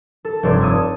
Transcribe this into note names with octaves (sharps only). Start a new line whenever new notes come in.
A4
F1 G2 C#5 D5 C6 E6
A5 D#6 E6 G#6